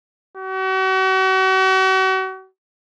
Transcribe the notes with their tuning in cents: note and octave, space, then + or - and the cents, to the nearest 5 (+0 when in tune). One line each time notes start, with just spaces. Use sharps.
F#4 +40